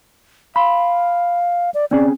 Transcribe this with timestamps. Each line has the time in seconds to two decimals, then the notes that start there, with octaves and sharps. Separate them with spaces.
0.56 F5 B5 C6
1.74 D5
1.91 C4 C#4 G#4 D5